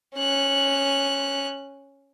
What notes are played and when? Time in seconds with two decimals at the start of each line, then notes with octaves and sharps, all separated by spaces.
0.16 C#4 F#6